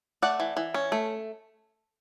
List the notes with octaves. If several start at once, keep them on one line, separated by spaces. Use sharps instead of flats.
A3 D5 F#5
E3
E3
C#4
A3